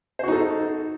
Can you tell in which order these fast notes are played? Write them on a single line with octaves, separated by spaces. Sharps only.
C5 F#4 D#4 A4